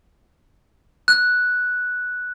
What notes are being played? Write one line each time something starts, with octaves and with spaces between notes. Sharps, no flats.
F#6